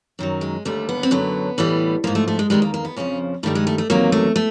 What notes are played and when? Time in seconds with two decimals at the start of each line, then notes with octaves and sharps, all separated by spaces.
0.19 F#2 D#3 F#3
0.41 G#3
0.65 D#2 D3 G3 A3
0.89 B3
1.03 C4
1.11 F#2 D3 F#3 B3
1.58 A2 E3 G3
2.04 G#2 F3 A#3
2.15 A3
2.28 A3
2.39 G#3
2.50 E2 C3 D#3 G3 G#3
2.62 A#3
2.74 A#3
2.85 B3
2.96 F2 C#3 F3 C#4
3.43 G2 D#3 G3 A3
3.55 G#3
3.67 A3
3.78 A3
3.90 E2 C3 D#3 F#3 A#3
4.12 A3
4.36 A3